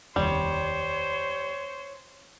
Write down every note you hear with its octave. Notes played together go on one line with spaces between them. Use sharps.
F1 D#2 G3 C5 C#5